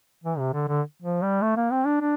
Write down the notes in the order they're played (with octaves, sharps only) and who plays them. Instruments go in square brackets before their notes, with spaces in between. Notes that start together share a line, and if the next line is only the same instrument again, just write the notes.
[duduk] E3
C3
D3
D3
F3
G3
A3
A#3
C4
D4
D4